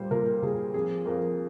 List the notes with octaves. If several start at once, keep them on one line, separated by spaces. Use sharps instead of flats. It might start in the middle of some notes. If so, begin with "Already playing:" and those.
Already playing: A#2 G3 C5
A#2 A#4
A#2 G#4
F2 G#4
F2 A#4